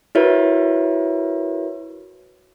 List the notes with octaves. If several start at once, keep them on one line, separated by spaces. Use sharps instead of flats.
E4 F#4 A#4 B4 C#5 E5